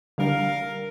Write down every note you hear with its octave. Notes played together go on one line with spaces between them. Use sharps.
D3 G3 D4 A#4 F5